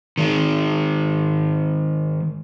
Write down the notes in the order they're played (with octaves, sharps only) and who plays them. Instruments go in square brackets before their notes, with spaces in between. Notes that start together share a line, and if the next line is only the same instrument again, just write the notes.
[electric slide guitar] D#3 G#3